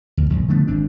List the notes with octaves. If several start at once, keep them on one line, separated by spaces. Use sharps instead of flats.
D2
A#1
D3 F3 A3 B3
G#1 C4 D4